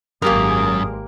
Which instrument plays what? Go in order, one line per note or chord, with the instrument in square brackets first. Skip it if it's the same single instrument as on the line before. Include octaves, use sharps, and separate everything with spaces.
[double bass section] G#1 G#3 [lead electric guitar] F#2 [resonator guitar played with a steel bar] A#3 G4 A#4 [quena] D#6